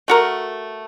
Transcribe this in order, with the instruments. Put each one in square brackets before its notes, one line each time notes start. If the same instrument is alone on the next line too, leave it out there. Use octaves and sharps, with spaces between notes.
[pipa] A3 F#4 A#4